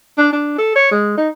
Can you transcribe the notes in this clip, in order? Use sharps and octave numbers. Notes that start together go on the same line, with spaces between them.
D4
D4
A4
C#5
G#3
D#4